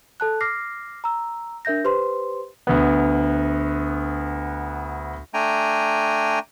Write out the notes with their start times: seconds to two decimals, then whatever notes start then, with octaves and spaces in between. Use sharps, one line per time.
0.20 A4 A5 F#6
0.41 D6 F6 A#6 C7
1.04 A#5 E6
1.65 D4 A#4 E5 G6 A#6
1.84 G4 B4 C5 C6
2.67 D2 B3
5.34 A3 D4 G5 G#5 A#5